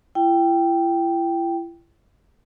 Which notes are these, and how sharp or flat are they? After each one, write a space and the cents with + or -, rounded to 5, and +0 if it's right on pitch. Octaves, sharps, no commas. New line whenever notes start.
E4 +40 G5 +0